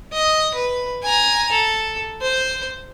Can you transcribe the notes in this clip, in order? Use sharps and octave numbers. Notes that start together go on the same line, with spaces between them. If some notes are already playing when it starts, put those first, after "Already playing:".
D#5
B4
G#5 A#5
A4
C5